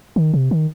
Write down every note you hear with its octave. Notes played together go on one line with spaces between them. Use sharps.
D#3
C3
D#3